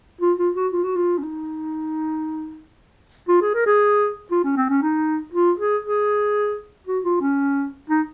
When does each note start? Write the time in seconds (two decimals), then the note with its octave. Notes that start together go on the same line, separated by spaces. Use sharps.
0.21 F4
0.38 F4
0.55 F#4
0.73 F4
0.84 F#4
0.95 F4
1.18 C#4
1.23 D#4
3.28 F4
3.42 G#4
3.54 A#4
3.66 G#4
4.31 F4
4.44 C#4
4.57 C4
4.69 C#4
4.82 D#4
5.34 F4
5.59 G#4
5.85 G#4
6.87 F#4
7.04 F4
7.21 C#4
7.90 D#4